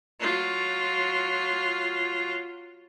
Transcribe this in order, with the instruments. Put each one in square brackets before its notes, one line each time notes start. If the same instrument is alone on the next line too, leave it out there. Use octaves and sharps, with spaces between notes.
[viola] F#3 F4